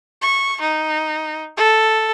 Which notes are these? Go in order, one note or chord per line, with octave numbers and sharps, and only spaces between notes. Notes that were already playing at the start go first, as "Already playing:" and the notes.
C#6
D#4
A4